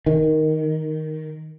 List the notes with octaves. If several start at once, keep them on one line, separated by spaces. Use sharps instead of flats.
D#3